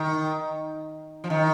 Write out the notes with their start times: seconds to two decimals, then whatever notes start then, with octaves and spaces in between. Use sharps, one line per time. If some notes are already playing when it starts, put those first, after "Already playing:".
Already playing: D#3
1.24 F3
1.30 D#3